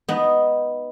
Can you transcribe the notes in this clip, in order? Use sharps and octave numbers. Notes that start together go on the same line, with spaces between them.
B3 D#4